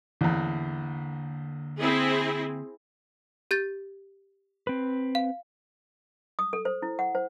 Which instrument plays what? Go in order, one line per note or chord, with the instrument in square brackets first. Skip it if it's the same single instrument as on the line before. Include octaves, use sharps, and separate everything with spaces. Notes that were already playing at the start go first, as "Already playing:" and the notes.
[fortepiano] A1 E2 [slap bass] D3 A#3
[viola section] C4 E4 G#4
[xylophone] G4 G6 A6
[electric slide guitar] C4 B4
[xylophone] F5
[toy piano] D#6
A4
C5
E4
F#5
C5